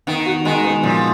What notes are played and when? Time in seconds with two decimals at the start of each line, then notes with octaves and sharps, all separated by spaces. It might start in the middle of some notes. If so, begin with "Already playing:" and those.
0.07 D#3 B3
0.26 F#4
0.45 D#3 G#3
0.64 B3
0.83 A#2 F3